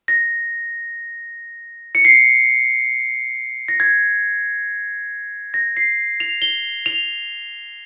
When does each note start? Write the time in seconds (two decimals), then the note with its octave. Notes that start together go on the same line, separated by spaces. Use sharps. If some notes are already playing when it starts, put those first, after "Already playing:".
0.08 A#6
1.95 C#7
2.05 C7
3.68 A#6
3.80 G#6
5.54 A#6
5.77 C7
6.20 F7
6.42 G7
6.86 F7